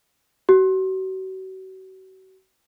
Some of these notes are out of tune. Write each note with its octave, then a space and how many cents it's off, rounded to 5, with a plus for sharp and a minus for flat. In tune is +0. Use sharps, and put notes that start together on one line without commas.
F#4 +35